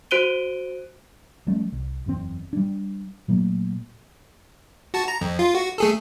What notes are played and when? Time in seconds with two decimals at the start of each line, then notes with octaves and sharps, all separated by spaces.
0.11 F#4 C5 F#6 D7 D#7 G7
1.47 F3 G3 A3 C#4
1.72 C2
2.06 F#1 E2 A2 C4
2.53 G3 D4
3.28 A#2 F#3 A3 A#3
4.94 F#4 A5
5.08 A#5
5.21 F2
5.39 F4
5.55 F#4
5.78 A3 G#4 A4